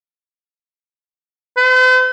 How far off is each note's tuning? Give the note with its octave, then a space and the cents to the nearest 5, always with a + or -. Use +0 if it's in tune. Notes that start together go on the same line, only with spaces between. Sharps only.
C5 -45